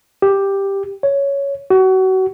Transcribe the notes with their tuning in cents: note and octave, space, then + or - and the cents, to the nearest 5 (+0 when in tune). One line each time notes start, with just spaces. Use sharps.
G4 +5
C#5 +10
F#4 +30